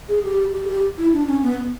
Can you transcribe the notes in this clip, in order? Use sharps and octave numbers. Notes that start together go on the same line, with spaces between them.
G#4
G4
G4
G#4
G4
E4
D4
C#4
B3